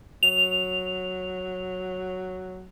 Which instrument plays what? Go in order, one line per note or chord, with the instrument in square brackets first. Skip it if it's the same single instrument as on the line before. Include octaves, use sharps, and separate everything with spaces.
[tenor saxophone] F#3 [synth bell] F7